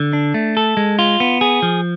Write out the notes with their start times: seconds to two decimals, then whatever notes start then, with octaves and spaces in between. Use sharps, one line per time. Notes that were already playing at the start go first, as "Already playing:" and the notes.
Already playing: D3
0.13 D4
0.34 A3
0.57 A4
0.77 G#3
0.99 F4
1.20 B3
1.41 G#4
1.62 F3